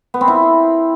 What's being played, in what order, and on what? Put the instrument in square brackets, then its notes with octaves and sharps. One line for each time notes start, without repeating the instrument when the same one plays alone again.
[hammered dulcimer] B3
C4
E4